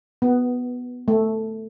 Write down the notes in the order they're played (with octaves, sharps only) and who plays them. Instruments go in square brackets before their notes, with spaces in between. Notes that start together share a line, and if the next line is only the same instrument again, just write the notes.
[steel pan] B3
A3